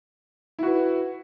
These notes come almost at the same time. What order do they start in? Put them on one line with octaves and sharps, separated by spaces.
E4 F#4 B4